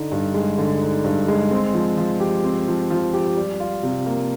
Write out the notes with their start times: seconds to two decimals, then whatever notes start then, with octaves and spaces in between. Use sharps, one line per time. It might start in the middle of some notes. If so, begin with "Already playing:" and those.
Already playing: D3 D#4
0.12 G2
0.34 G#3
0.58 D3
0.81 D#4
1.04 G2
1.28 G#3
1.51 C4
1.74 F3
1.97 F3
2.20 G4
2.44 C4
2.68 F3
2.90 F3
3.13 G4
3.36 G3
3.60 F4
3.83 C3
4.06 A#3